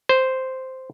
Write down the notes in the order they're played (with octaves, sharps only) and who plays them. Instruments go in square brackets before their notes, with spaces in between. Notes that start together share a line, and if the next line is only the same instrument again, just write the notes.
[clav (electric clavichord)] C5